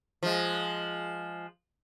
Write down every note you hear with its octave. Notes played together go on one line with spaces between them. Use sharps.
F3 G#3